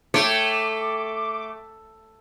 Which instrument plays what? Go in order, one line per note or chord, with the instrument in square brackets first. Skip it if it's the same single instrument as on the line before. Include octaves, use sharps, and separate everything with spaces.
[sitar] A3 [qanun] C#5 G5 [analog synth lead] D6